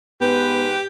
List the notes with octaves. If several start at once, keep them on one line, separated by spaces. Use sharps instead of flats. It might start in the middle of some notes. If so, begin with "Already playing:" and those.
G#2 B3 G4 B4